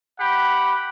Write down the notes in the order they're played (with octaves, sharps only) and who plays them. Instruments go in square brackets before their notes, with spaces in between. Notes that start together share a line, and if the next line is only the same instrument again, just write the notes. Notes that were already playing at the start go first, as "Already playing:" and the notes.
[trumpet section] G4 F#5 B5